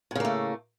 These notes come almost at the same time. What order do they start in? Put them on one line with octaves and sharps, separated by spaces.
A2 C#3 A#3 A3